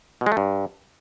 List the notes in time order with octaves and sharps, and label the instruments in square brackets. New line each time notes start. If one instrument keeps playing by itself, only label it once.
[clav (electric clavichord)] B2
G#3
A3
G2